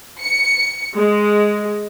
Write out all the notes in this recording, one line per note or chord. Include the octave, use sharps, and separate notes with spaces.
C#7
G#3